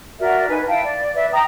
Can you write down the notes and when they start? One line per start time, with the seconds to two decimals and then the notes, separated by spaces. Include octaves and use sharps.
0.19 F#4 A#4 D5 E5
0.48 D#4 B4 G#5
0.67 E4 F5 G5 A5
0.84 D5
1.13 B4 D5 E5
1.33 G5 A#5 D#6